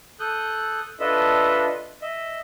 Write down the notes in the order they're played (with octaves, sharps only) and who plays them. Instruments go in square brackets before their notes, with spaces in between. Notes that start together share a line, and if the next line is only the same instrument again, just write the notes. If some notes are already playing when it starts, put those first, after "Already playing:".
[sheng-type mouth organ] A4 D#6 F#6 G6
D4 F4 A4 B4 D#5 E5
D#5 E5